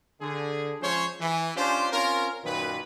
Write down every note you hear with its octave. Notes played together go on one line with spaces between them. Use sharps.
D3 G#4
F3 G#3 C#4 C5 C#5
E3
C#4 D4 F4 G4 C5
C4 C#4 F4 A#4
F#2 A#2 D#3 B4